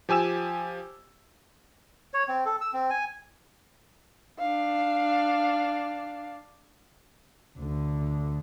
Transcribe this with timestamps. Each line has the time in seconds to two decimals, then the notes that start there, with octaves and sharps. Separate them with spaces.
0.09 F3 G4 G#5 E6 E7
2.14 C#5
2.28 C4
2.45 A4
2.61 E6
2.73 C4
2.90 G#5
4.39 D4 F5
7.58 D2 D3